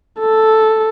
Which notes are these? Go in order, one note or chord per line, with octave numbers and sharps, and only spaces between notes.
A4